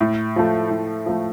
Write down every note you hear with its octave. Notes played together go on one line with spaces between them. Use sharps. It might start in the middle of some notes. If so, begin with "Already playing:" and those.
A2
F3 A3
A2
F3 A3